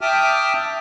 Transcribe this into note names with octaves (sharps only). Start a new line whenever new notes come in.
E5 G5 A5 D6 D#6 F6